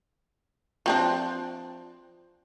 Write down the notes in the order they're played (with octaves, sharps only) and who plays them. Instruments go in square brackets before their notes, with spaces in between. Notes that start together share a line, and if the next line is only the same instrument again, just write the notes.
[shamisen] F3 C4 D4